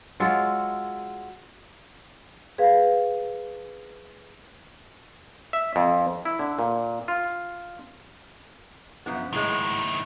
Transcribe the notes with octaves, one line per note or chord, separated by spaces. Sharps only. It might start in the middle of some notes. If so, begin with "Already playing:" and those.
F#3 G#3 F4 A4
G#4 B4 F5
E5
F2
E4
D3
A#2
F4
F#2 F3 B3
A2 D#3 F#3 G#3 E4